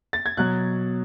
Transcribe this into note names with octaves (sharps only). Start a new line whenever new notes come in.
A6
G#6
B2 F#3 F#6